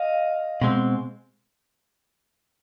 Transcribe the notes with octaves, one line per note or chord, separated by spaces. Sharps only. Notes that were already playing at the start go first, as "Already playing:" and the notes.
Already playing: D#5 F5
B2 G#3 C4